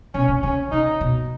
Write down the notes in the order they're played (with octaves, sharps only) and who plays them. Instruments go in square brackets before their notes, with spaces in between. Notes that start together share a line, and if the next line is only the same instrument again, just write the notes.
[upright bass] B2 [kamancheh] C#4
[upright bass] C#3
[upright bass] C#3 [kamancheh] C#4
[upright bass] C#3 [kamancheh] D#4
[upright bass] B2